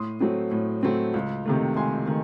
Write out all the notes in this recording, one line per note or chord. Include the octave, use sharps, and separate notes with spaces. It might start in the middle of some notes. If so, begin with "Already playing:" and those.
Already playing: A2 C6 D#6
F#3 A3 C4
A2
F#3 A3 C4
C#2
C3 D#3 A3
C#2 G#5 C6
C3 D#3 A3